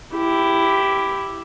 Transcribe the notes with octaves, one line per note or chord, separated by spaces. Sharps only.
E4 G4